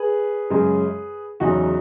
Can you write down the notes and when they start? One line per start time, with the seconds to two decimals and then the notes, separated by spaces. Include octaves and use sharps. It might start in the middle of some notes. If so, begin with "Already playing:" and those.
Already playing: G#4 B4
0.50 F#2 C#3 G#3
1.40 E2 C#3 F#3 D#4 F#4